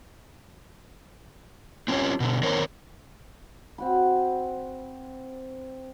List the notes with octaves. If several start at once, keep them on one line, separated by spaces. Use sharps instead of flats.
C4 C#4 F4 G4 C#5
B2 D3
D#3 C4 A#4 C5 C#5
C4 F#4 B5